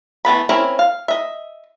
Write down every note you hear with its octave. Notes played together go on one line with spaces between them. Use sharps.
E3 A3 B3 B5
C4 C#4 E4 A#4 B5
F5
D#5 E5